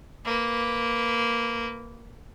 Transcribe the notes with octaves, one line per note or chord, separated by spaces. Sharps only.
A#3 B4